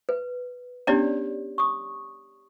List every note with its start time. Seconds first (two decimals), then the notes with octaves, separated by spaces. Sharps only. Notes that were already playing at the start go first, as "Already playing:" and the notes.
0.09 B4
0.87 B3 C#4 D4 G4 C#5 D5
1.58 C#6 D#6